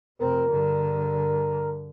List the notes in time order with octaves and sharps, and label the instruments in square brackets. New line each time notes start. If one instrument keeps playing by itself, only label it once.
[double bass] F1 C4 [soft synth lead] A#4
[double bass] G2 D3